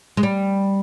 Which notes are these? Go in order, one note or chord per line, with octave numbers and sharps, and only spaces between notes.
G#3
G3